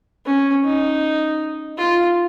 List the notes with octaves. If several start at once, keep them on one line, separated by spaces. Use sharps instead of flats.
C#4
D#4
F4